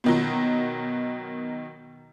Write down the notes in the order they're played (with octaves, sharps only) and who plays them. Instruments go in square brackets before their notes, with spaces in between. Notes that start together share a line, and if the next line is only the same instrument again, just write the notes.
[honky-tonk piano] B2 D#3 F#3